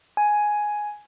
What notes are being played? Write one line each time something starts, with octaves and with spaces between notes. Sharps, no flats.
G#5